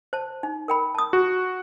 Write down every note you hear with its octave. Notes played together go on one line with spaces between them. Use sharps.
C5 A5
D#4
A#4 G5 B5
A5 D#6
F#4